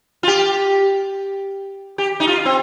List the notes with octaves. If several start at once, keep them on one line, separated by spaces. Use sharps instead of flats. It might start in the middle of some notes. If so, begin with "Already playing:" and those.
F4
G4
G4
D#4
F4
C4